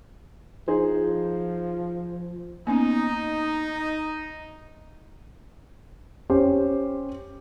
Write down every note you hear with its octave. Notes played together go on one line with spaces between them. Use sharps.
F3 D#4 G#4 C5
A#3 B3 C#4 D#4
C#4 G4 C5